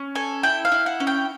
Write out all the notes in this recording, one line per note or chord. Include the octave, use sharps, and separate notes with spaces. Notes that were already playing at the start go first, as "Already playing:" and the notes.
Already playing: C#4
A4 G#5
E4 G5
F5
E4
F#5
C#4
G5